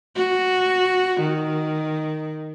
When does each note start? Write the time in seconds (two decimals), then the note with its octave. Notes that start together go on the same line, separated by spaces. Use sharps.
0.16 F#4
1.20 D#3